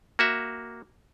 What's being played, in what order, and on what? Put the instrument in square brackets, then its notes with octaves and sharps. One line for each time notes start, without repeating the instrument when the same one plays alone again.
[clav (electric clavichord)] A#3 F#4 E5